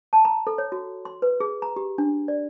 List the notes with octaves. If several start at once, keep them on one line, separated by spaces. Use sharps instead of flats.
A5
A#5
A4
C#5
F#4
C6
B4
G#4
A#5
G4
D4
D5